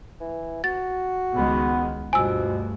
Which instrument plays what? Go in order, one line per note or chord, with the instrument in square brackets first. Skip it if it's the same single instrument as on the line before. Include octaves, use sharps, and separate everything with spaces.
[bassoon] E3
[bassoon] F#4 [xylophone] A6
[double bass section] C#2 D#3 G#3 [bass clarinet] B3
[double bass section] D2 G2 [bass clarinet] B2 [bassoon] F3 [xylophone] G#5 E6